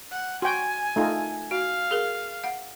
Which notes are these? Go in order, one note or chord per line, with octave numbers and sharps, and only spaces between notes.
F#5
F#4 G5 G#5 C6
A3 D#4 F4
F#4 F5
G#4 A#4
F5 F#5